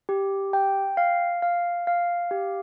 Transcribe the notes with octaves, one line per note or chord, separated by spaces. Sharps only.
G4
G5
F5
F5
F5
G4